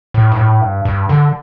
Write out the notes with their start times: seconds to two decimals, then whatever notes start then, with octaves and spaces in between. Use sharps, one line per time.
0.14 A2
0.32 G2
0.37 A2
0.61 G2
0.85 G2
1.09 D3